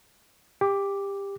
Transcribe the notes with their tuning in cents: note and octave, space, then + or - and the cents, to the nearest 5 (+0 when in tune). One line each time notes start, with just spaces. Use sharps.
G4 +20 D6 +0